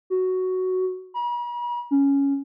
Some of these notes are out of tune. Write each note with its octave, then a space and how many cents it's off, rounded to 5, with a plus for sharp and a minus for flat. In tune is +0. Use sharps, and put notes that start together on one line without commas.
F#4 +5
B5 -45
C#4 +5